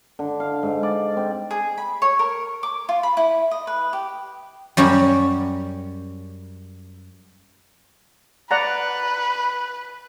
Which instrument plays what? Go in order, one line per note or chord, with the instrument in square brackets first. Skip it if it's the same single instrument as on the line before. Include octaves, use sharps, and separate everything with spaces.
[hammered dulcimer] D3
F5
G#2
D5
C4
[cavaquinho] G#4
B5
C#5
A#4
D6
F4
B5
E4
D#5
B4
G4
[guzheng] F#2 G3 C#4 F#4 G4
[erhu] B4 [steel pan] D5 F#5 A#5